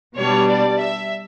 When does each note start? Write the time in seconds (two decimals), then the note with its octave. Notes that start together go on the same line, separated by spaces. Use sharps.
0.16 B2 G3 D4 C#5
0.47 D5
0.78 E5